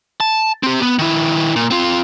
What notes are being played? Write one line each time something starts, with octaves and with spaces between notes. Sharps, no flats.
A5
C4 G4
B3
D#3 E4
A#2
C4 F4